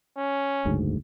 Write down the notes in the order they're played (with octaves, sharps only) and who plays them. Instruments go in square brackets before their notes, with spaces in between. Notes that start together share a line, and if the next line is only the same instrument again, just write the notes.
[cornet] C#4
[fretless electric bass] F#1 D2 G#2